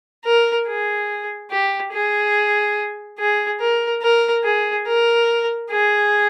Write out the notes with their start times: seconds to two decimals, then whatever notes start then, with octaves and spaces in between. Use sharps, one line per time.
0.24 A#4
0.67 G#4
1.51 G4
1.92 G#4
3.19 G#4
3.60 A#4
4.02 A#4
4.44 G#4
4.87 A#4
5.70 G#4